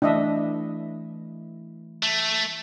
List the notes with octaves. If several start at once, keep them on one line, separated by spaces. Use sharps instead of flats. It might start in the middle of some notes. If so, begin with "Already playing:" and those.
E3 A3 D4 E4 D#5 E5
A3